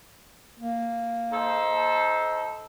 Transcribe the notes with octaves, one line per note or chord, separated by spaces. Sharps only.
A#3
D#4 A4 C5